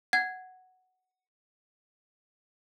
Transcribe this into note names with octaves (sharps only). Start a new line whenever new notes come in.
F#5 G#6